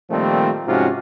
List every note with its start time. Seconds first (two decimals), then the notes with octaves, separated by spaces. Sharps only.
0.10 A#2 D#3 F3 G3 A3 C4
0.67 G#2 C3 F3 C#4 F4 F#4